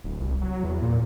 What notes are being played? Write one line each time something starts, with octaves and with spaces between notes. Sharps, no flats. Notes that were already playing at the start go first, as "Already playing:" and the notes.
D1
C2
F#3
E2
A#2